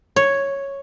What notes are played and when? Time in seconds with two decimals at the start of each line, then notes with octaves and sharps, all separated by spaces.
0.16 C#5